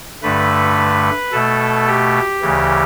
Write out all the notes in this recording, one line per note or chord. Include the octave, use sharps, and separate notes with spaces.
G2 D3 A3 B4
B2 A3 A4
G4
D2 C#3 E3